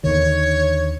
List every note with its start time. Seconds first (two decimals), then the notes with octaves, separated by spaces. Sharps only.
0.04 D#2 D3 D#3 C#5